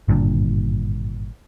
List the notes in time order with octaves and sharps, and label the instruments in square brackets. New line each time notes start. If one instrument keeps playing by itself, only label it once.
[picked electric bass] G#1 G2 A#2 D3